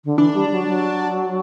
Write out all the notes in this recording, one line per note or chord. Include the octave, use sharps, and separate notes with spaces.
D3
E3 D4
G3
F#3
F#3